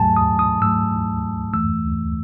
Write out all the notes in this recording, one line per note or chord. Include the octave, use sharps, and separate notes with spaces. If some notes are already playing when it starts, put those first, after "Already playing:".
Already playing: G#2 F#3 A3 G#5 A5
D#6
D#6
G#2 F#3 A3 E6
F#2 E3 A3 E6